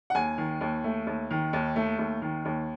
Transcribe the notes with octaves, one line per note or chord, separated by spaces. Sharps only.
F#5
D#2 G#5
D#3
D#2
A3
D#2
D#3
D#2
A3
D#2
D#3
D#2